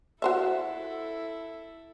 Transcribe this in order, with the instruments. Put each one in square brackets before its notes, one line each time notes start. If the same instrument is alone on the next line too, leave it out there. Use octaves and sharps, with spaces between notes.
[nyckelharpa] E4 A4 [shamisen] F#4 C5 E5